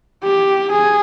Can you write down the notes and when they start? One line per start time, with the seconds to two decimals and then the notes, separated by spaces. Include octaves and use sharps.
0.24 G4
0.71 G#4